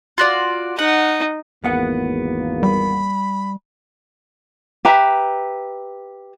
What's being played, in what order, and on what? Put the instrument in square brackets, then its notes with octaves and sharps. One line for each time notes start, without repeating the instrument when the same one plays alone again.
[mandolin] F4 F#4 D5
[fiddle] D#4 [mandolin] F#5
[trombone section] G#1 E2 A#3 [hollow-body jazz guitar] B3 F#5
[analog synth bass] G3 [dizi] B5
[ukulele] G4 B4 E5 A#5